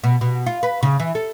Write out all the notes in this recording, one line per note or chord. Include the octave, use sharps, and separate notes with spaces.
B2
B2
F4
B4
C#3
E3
A4